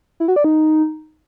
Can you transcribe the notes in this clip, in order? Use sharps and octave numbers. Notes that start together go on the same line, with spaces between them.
E4
F#4
D5
D#4